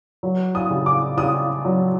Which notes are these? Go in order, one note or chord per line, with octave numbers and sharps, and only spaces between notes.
F#3
D#6
C#3
D6
C#3 D#6
F#3